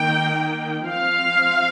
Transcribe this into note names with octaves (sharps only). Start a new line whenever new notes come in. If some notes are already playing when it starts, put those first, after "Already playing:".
Already playing: D#3 A#3 G5
F3 C4 F5